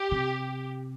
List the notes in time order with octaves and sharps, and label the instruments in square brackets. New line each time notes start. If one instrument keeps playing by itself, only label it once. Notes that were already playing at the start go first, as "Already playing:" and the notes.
Already playing: [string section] G4
[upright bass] C3